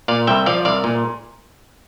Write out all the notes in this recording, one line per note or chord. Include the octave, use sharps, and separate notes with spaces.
A#2 D5 F5
C2 E5 G5
F3 D5 F5
C2 D5 F5
A#2